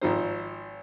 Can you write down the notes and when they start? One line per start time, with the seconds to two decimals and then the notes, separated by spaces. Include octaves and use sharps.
0.01 G#1 F3 D#4 C5